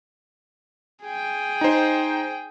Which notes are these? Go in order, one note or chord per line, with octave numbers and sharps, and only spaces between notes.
G#4 G5
D#4 C5